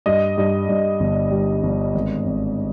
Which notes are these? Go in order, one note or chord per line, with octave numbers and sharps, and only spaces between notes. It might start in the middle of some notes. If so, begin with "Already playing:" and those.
G2 D#5
G2
G2
G1
G3
G1
G#1
G#1